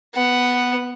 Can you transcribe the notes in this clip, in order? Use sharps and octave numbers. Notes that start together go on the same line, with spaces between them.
B3 F#5